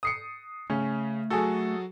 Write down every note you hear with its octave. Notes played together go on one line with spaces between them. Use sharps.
D#6 C7 C#7
C#3 A3 C#4
F#3 F#4 G#4 A4